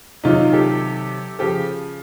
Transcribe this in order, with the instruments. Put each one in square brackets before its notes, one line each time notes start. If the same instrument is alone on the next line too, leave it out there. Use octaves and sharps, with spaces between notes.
[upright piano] C3 D#3 F#3 D#4 F4
G4 A4
C#3 F3 G4 A4